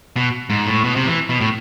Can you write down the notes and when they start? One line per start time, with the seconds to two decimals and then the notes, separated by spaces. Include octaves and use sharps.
0.16 B2
0.50 G#2
0.67 A2
0.84 B2
0.96 C3
1.07 E3
1.29 B2
1.41 A2